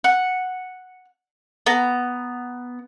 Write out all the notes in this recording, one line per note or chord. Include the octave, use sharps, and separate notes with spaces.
F#5
B3 A#5